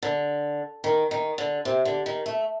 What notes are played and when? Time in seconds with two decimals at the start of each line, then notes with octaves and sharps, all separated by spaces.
0.03 D3
0.84 D#3
1.11 D#3
1.38 D3
1.65 C3
1.85 D3
2.06 D#3
2.26 A3